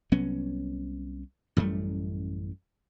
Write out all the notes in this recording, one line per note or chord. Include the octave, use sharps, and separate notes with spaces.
C2 F#3 B3 C#4
A1 F#2 G3 A3